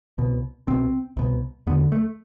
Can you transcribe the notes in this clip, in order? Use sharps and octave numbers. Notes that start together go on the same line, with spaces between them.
C2 B2
C2 B2 C4
C2 B2
E2 D3 B3
A3